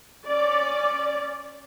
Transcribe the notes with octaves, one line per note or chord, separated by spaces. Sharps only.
C#4 D5